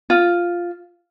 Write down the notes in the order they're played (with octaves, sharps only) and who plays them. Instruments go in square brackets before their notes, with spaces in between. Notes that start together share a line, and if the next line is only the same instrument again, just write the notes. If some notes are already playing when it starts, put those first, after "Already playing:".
[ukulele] F4